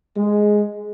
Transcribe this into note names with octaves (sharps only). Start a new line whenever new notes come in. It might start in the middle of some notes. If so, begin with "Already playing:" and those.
G#3